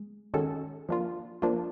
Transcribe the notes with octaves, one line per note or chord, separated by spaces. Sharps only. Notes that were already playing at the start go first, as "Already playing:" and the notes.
Already playing: G#3
D#3 G#3 C#4 F#4 A4
F3 A#3 D4 F4
F3 A#3 D4 F4